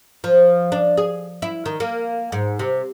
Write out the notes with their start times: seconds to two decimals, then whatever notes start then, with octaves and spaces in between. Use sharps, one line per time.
0.24 F3
0.72 D4
0.97 G#4
1.42 E4
1.66 D#3
1.80 A#3
2.32 G#2
2.59 C3